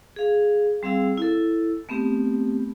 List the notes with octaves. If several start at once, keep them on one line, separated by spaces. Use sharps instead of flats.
G#4 F5
G3 C4 G#4 F5 E6
E4 A4
A3 B3 C4 G4